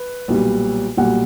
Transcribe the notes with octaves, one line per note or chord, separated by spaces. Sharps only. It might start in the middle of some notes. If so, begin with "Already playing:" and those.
Already playing: B4
B1 A#2 G3
B1 A#2 G3 F#5